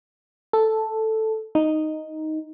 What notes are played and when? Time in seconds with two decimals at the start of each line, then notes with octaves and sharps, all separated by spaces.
0.53 A4
1.55 D#4